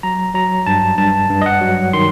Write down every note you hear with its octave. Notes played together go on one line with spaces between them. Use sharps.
F#3 A#5
F#3 A#5
G2 A5
G2 A5
G2
D#5
F#5
F#3
D#3 C6